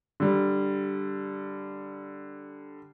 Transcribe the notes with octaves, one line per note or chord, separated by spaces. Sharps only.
D3 G3